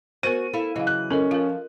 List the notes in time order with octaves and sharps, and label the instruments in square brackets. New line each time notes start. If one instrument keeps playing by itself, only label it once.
[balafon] B3 A#4 C5 [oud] F#4 [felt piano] D#7
[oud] E4 A4 F5
[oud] C#3 E3 F#3 [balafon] D#5 F5
[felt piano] F#6
[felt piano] C#4 [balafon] A4 A#4 D#5
[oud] F3 [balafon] F4 A#4